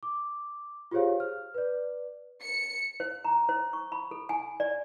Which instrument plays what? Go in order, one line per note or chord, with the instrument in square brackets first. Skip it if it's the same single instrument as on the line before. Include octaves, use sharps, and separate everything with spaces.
[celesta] D6
F4 G4 G#4 C5 C#5 F5
F6
B4 D5
[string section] C#7
[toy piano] C5
A#5
C5
C#6
B5
A4
G#5
D5